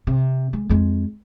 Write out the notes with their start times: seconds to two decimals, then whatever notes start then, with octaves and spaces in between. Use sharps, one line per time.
0.07 C3
0.53 G#3
0.69 F2 G#3